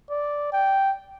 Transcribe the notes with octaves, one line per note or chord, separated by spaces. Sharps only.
D5
G5